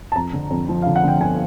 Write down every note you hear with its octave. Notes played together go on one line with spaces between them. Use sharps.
A5
F2 A#5
D3
F2
F3
D3 F5
F#5
D3 G5
G1 G#5